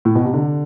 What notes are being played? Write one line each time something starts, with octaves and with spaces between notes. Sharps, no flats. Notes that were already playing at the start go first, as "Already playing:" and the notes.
A2
B2
C3
D3